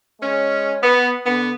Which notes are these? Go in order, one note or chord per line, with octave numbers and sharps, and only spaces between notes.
G#3 C#4
B3
D3 B3